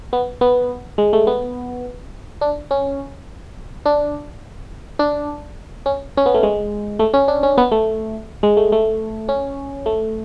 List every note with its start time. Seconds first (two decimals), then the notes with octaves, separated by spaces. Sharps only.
0.13 B3
0.41 B3
0.98 G#3
1.13 A3
1.27 B3
2.41 D4
2.71 C#4
3.86 D4
4.99 D4
5.86 C#4
6.17 C#4
6.26 B3
6.34 A3
6.43 G#3
6.99 A3
7.14 C#4
7.28 D4
7.43 C#4
7.58 B3
7.72 A3
8.43 G#3
8.57 A3
8.72 A3
9.29 C#4
9.86 A3